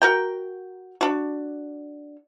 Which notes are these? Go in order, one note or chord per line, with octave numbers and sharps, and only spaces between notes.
F#4 A#4 G5
D4 F#4